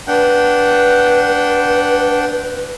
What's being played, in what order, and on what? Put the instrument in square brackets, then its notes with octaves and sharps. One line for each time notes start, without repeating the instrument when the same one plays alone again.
[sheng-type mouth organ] D4 F#5 G5 [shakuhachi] B4